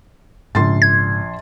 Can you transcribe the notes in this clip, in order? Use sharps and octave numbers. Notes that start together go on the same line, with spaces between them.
A#1 G#2 C#3 C6 A6
G#6